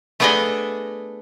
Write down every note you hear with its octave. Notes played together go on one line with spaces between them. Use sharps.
A3 B3 D4 G#4 D5 D#5